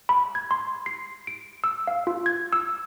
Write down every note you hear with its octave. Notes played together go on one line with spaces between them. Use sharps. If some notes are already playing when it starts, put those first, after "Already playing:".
B5
G#6
C6
C7
D7
E6
F5
F4
G#6
E6